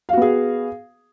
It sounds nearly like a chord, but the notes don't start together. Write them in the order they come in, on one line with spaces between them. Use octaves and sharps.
F5 F#4 B3 G#4